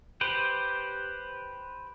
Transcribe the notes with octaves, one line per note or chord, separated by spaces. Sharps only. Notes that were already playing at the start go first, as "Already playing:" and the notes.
G4 B4 C5